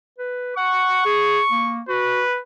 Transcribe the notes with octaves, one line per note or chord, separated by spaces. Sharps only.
B4
F#5 C#6
G#4
A#3
F#4 B4